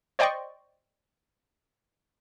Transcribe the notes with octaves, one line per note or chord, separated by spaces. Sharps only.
C5 D5 D#5 G5 C6 C#6